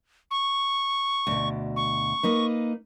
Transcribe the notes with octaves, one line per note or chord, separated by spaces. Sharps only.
C#6
D2 B2
C#6
A#3 D#4 B4